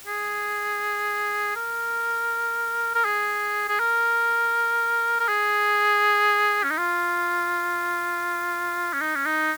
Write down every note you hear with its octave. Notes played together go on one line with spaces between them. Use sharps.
G#4
A#4
A#4
G#4
G#4
A#4
A#4
G#4
C#4
D#4
F4
C#4
D#4
C#4
D#4